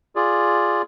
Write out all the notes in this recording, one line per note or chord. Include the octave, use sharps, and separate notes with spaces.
F4 G#4 D5